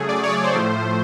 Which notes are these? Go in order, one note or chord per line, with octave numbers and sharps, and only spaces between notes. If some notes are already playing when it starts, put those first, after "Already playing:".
Already playing: C#3 F#3 A3 G#4
D5
C#5
D5
C#5
C5
A2 F3 A3